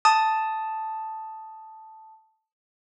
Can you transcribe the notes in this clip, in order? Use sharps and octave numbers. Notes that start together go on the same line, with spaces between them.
A5 D#6